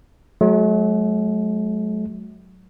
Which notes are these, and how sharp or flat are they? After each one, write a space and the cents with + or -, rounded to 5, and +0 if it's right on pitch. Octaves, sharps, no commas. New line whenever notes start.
F#3 +0 A3 -45